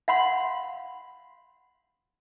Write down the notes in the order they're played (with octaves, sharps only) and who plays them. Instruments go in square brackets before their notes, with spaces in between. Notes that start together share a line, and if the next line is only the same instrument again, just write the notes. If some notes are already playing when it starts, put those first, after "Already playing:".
[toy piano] F5 F#5 B5 C6